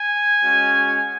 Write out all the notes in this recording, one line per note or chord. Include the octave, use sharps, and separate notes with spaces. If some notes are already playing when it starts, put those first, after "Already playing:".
Already playing: G#5
G#3 C#4 F#4